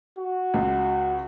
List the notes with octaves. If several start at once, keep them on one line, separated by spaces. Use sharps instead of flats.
F#4
C#2